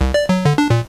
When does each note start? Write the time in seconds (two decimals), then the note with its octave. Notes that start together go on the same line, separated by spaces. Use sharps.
0.01 C2
0.14 D5
0.29 F#3
0.45 D3
0.58 D4
0.70 A#2